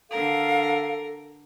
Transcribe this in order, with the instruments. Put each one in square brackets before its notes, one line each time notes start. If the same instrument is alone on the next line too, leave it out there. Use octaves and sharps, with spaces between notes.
[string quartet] D3 A#4 [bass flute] A4 [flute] F5